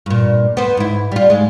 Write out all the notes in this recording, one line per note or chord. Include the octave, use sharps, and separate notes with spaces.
G2 A#2
B3 C5
G#2 E4
G3 F4
G#2 G#3